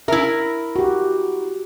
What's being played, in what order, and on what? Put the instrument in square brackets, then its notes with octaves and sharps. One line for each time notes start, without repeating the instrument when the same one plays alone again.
[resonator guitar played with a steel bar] E4 A#4 [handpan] E5
[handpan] F#4 G4